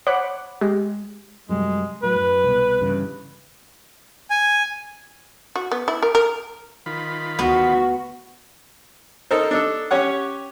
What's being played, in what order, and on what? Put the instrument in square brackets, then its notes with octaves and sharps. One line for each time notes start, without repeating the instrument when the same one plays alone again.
[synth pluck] C5 C#5 F#5 B5 D6 F#6
G#3 G4
[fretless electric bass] F#2 C3 G3 [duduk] G#3
[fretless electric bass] A2 F#3 [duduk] B4
[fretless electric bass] F#2
C2 B2
G2 C#3 E3
[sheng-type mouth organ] G#5
[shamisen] F#4
B3
E4
A#4
A#4
[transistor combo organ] D#3 F4 B5
[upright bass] D2 [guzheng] B3 [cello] F#4
[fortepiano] D#4 A4 A#4 C5
D4 D#4 A4
C#4 G4 C#5 F#5